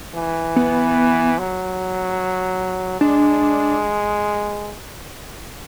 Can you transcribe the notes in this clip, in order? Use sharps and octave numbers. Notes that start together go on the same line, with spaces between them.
E3
B3
F#3
G#3 D4